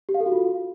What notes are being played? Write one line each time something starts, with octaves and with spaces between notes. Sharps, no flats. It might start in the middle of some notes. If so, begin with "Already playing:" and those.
G4
F5
A4
F#4
F4